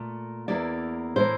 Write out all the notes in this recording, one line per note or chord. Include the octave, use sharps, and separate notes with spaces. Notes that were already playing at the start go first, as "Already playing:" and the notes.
Already playing: A#2 A3
E2 E3 A#3 E4 D5
A2 E3 A#3 C5